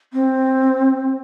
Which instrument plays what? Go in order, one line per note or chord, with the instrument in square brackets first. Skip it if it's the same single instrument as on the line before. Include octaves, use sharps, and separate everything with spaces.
[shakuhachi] C4